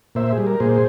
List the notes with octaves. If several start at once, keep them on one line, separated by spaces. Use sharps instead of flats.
A#2 C5 E5
G#4
G3
A#4
A#2 G#4 C5